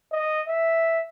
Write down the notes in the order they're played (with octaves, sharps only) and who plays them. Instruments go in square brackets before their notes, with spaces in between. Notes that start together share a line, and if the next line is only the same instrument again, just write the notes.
[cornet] D#5
E5